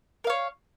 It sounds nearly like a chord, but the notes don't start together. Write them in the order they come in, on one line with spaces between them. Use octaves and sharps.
A#4 F5 C#5